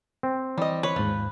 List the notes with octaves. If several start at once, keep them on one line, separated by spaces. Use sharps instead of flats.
C4
E3 G3 D#5
B4 C#5
D#2 G#2 F3